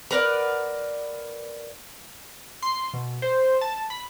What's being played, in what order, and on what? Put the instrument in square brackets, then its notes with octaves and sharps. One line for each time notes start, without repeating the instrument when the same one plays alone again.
[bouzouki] A#4 B4 D5 F#5
[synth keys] C6
B2
C5
A5
B5